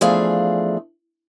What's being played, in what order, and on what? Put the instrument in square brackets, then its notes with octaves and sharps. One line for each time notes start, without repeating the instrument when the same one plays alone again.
[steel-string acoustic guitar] E2 F3 A3 D4 G#4 F5